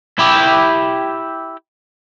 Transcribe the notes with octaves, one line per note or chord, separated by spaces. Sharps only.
E4 G4